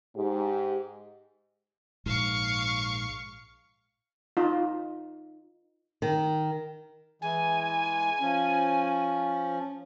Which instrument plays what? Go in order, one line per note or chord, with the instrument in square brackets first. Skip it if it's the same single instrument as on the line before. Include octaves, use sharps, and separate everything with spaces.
[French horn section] G#2 G4
[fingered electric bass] A#1 G#2 [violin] F5 C#6
[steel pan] D#4 F4
[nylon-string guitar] D#3
[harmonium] E3 G#3 [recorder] G#5
[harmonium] F3 C#4